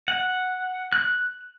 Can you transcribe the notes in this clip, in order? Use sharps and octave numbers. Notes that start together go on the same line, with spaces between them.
F#5
F#6